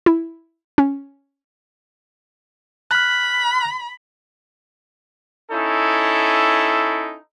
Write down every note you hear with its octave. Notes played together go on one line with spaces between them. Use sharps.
E4
C#4
B5 F6 F#6
C#4 D#4 E4 A4